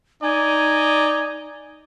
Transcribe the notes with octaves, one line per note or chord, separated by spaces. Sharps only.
D#4 D5 G#5